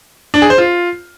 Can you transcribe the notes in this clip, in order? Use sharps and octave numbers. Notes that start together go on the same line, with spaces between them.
D4
G#4
C5
F4